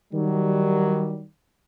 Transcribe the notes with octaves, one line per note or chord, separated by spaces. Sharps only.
D#3 F#3 G3